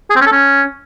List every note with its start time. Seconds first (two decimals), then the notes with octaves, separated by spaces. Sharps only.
0.10 G#4
0.16 C4
0.21 C#4
0.26 A4
0.32 C#4